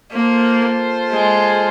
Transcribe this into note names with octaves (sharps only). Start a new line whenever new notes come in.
A#3 F4 A4 C5
G#3